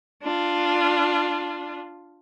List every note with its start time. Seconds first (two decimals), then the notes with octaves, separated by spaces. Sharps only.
0.23 D4 F4